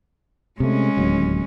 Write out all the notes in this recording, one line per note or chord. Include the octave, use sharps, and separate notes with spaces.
C3 G#3 A3 C#4
D1 D#2 F#3